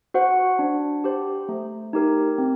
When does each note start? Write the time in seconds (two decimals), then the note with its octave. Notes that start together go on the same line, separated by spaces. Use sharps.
0.14 F#4 C5 F#5
0.59 D4
1.04 G4 C5
1.49 A3
1.93 D#4 G4 A#4
2.38 C4